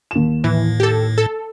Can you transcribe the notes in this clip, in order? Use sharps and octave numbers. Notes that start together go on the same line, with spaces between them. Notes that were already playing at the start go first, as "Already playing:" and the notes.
D#2 E7
A2 E3
G4 A4
A4